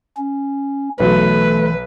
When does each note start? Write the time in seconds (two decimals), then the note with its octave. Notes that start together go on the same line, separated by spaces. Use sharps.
0.17 C#4
1.00 B1 E3 F#3 A3 B4